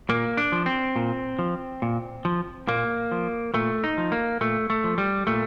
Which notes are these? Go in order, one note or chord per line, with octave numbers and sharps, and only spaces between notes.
A#2 A#3
D4
F3
C4
A#2
F3
A#2
F3
A#2 A#3
F3
A#2 A3
D#4
F3
A#3
A#2 A3
A3
F3
G3
A#2 A3